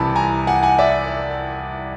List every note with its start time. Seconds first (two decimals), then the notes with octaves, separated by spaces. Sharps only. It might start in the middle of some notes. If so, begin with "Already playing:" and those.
Already playing: C2 C3 E3 A5 B5
0.16 G#5 A#5
0.47 F#5 G#5
0.63 F#5 G#5
0.78 D5 E5